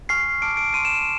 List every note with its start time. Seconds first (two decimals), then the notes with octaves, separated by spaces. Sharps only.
0.09 G#5 C#6 F6 C7
0.42 A5 D6 F6 D7
0.57 D7
0.74 C6 F6 D#7
0.85 E7